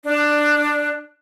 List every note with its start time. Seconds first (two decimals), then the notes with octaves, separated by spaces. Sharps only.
0.05 D4